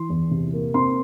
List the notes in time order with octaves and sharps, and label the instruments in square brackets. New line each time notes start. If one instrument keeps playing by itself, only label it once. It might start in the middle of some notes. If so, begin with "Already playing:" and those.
Already playing: [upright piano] E3 C6
E2
C3
A#3
C4 C6